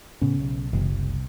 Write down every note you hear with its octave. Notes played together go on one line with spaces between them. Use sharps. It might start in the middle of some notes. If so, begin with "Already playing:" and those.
A2 C#3 B3 C#4
B1
F#1 C3 E3 G#3
C2